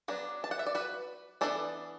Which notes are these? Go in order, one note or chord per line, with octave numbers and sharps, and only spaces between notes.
F#3 B3 D4
A5
F#5
E5
D5
F#4 B4
E3 B3 D4 A4 D5